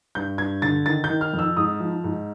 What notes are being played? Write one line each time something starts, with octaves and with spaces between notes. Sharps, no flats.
G2 G6
G2 G#6
D3 A6
D#3 A6
G6
D#3
F6
F2
E6
G#2 D#6
F3
G#2